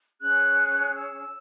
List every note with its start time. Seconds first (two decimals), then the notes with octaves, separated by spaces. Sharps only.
0.21 C#4 G#4 C#5 F#6
0.94 E6